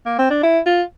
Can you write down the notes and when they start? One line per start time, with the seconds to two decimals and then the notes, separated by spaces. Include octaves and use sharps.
0.06 A#3
0.19 C4
0.30 D4
0.43 E4
0.66 F4